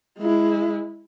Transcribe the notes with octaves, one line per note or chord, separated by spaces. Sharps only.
G#3 E4